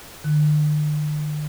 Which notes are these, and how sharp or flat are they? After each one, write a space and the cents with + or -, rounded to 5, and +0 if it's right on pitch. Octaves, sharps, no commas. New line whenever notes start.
D3 +45